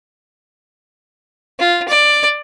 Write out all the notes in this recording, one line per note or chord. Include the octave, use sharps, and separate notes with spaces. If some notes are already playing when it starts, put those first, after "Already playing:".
F4
D5